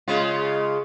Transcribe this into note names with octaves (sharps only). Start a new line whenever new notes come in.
C#3 G#3 F4